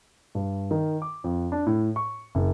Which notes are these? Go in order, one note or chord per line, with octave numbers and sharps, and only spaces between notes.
G2
D#3
D6
F2
D4
A2
C#6
F#1